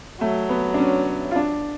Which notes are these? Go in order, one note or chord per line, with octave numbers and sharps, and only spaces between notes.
F#3 A3
B3
D4
C#4
F4
D4